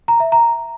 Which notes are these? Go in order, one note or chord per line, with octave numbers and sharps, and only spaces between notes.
A#5
E5
A#5